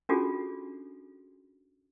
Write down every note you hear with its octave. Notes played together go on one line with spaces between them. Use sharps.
C#4 D4 F4 F#4 G#4 A4